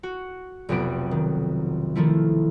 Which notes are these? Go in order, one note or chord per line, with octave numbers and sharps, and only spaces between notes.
F#4
F1 B1 F2 C3 B3 D7
D#3
D#3 F3 A3 E4